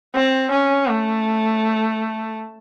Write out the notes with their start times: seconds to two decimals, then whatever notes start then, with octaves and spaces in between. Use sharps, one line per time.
0.15 C4
0.51 C#4
0.88 A3